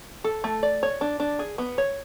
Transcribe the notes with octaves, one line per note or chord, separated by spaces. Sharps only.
A4
A3
D5
C#5
D4
D4
G#4
B3
C#5